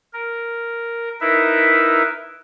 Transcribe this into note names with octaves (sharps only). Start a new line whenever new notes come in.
A#4
D#4 E4 A#4 B4 E5